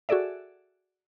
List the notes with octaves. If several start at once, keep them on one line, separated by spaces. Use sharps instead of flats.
F#4 G#4 A4 D5 E5